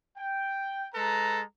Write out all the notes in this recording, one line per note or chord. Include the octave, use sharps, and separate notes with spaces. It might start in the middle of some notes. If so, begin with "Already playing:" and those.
G5
G#3 A4 B4 A#5